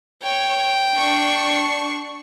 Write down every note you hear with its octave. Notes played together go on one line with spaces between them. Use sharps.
C#5 G5
D4 C#6 C7